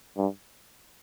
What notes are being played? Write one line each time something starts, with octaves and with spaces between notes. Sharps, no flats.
G2